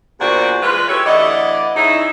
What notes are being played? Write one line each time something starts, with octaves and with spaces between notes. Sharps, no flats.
E2 A#2 D4 F#4 C5 D5
E3 G#3 F4 B4
E4 G4 A4 C#5
D2 E3 A3 D5 D#5 F#5
C#3 D#4 E4